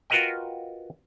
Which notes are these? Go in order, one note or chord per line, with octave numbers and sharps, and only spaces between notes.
F4 F#4 A#4 B4 D#5 G5